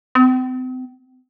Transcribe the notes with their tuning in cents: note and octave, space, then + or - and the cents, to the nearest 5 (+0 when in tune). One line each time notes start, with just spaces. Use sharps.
C4 -40